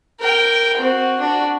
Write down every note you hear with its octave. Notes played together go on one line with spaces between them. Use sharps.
A#4 G5
C4 F#4
D4 F#4